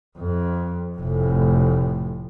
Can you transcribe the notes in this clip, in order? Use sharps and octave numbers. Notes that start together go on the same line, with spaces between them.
F2
F1 A2